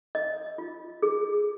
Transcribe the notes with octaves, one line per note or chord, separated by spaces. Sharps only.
D#5
F4
G#4